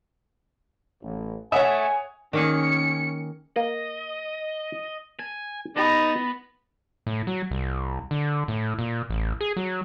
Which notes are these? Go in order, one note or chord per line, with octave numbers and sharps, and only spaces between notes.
A1
A3 C#5 E5 F#5 G#5 D#6
D#3 A#3 C#4 G#4 C#7
A#3 D#5
G#5 A5
B3 D#4 G4 A5 B5 A6 A#6
A2
F#3
C2
D3
A2
A#2
A1
G#4
F#3